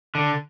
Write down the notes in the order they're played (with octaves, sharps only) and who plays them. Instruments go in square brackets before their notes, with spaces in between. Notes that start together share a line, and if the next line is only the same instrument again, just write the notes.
[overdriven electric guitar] D3